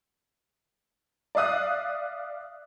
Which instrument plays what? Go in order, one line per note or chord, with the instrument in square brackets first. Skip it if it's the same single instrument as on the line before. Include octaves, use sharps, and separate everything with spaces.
[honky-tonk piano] D5 E5 F5 D#6 F#6